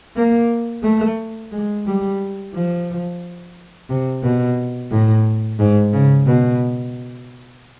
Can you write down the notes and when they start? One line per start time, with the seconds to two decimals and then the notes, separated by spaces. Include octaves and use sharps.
0.16 A#3
0.83 A3
1.52 G#3
1.86 G3
2.54 F3
3.89 C3
4.23 B2
4.91 A2
5.59 G#2
5.93 C#3
6.27 B2